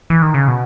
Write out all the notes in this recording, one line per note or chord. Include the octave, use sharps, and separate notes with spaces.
E3
D#3
C#3
B2